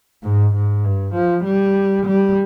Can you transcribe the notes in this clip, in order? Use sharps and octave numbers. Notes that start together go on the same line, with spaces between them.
G#2
G#2
G2
F3
G3
G3